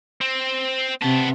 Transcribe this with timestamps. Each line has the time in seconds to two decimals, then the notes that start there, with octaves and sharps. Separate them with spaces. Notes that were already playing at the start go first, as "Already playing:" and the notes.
0.21 C4
1.02 C3 B3 A5